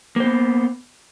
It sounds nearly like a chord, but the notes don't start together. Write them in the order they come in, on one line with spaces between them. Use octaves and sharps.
A#3 C5 B3